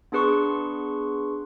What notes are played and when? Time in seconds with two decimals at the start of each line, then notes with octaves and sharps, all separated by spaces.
0.12 B3 D4 G#4 B4 C6 C#6